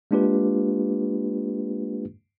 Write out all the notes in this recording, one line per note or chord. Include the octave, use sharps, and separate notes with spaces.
G#3 A#3 D4 F4 G4 B4